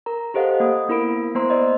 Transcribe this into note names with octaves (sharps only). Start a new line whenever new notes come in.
A#4 A#5
G4 A4 C5 D#5 F5 F#5
A#3 D#6
B3 E4 A#4 B5 D7
A#3 B3 C5 A#5 C6
C5 D5 D#5